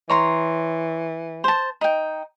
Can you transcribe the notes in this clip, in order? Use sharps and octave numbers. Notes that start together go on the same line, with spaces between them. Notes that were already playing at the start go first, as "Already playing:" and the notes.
E3 C#5 A#5 C6
C5 A5
D#4 G5